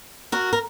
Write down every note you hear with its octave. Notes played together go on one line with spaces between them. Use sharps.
F#4 A#4
A#4